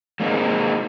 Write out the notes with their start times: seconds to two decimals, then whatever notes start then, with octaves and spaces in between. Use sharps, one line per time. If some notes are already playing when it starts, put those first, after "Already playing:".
0.20 G#3 A#3 C4 D#4